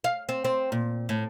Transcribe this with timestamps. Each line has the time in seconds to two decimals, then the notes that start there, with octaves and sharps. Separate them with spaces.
0.04 F5
0.29 C4
0.45 C4
0.72 A#2
1.09 A2